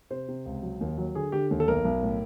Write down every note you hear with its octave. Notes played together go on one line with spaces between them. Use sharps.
C3 C5
C3
C#2
F#3
D#2
F#3
D3 G#4
D3 G4
D#2
A4
B1 A#4
B1
A2